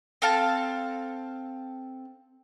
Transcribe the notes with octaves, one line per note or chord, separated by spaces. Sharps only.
C4 A4 F5 A5